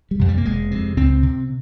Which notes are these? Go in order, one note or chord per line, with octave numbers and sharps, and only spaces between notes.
G3
F2 C3
G3
A#3
F1 G#3
F2 C3
C#2 C4
C3